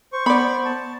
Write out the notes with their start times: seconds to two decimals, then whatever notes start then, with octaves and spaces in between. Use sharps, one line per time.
0.13 C5 C#6
0.26 B3 D5 B5
0.65 A5